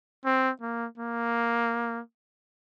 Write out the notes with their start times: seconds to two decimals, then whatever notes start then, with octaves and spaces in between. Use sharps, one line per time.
0.25 C4
0.61 A#3
0.98 A#3